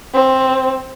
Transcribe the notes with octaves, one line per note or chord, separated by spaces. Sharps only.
C4